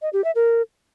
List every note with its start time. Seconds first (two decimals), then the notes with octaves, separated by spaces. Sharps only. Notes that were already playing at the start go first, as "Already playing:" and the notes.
0.02 D#5
0.13 G4
0.24 E5
0.35 A#4